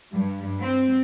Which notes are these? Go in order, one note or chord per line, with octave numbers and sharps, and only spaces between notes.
G2
C4